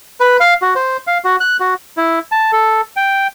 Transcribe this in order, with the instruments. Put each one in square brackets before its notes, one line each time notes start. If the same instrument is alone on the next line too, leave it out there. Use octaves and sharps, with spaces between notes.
[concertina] B4
F5
F#4
C5
F5
F#4
F#6
F#4
E4
A5
A4
G5